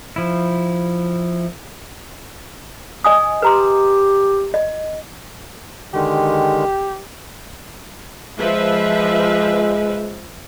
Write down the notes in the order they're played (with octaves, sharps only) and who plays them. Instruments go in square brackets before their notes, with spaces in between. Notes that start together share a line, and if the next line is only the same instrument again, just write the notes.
[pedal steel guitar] F3 E4
[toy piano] D#5 G#5 D#6
[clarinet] G4 [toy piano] B4 A#5 C6
[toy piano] D#5
[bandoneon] D3 D#3 G#3 [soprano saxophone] G4
[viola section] F3 B4 E5 [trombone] G#3